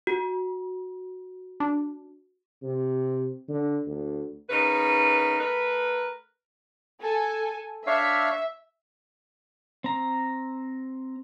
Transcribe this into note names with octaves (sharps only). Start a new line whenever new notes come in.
F#4
D4
C3
D3
D2
C#3 D#4 A#4 B4
A3 A#4 B4
A4 G#5
D4 C#5 E5 F5
C4 A#5